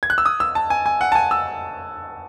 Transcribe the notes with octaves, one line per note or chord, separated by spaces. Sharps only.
G#6
F#6
E6
D#6
E6
A5
G#5
G#5
F#5
A5
G#5
E6